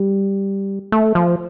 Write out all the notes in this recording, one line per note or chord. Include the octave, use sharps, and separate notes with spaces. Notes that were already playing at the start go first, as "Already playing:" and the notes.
Already playing: G3
A3
F3